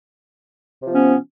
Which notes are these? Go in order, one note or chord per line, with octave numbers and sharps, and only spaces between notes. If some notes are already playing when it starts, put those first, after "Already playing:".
C3 F3 B3 C#4